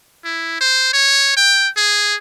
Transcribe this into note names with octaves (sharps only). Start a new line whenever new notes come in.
E4
C5
C#5
G5
G#4